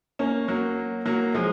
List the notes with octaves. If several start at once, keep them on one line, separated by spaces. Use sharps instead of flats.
A#3 C#4
F#3 A#3
F#3 A#3
F3 G#3